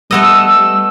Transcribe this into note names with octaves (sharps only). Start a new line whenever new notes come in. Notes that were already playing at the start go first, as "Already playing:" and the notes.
G3 A3 B3 D#5 E6